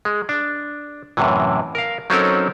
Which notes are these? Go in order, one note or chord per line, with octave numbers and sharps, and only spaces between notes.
G#3
D4
F#2 A2 C3 E3
A#4 F5
F#3 C4 C#4 D#4 A4 A#4